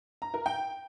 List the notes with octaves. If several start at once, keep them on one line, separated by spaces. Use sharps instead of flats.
A#5
A#4
G5